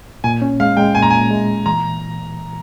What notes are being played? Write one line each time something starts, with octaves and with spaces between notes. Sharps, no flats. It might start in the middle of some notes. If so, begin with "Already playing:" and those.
A#2 G#5
C#4
G#3 F5
G#3 G5
A#2 G#5
A#5
A#2 G#5
G#3
A#2
E3 A#5